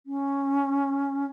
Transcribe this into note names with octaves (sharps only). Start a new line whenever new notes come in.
C#4